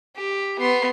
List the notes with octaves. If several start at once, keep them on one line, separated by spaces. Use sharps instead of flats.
G4
B3 C6